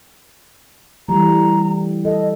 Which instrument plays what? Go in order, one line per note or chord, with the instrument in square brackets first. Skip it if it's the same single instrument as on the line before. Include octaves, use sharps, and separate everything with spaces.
[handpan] E3 G3 A3 [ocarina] A#5
[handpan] A4 [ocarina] D#5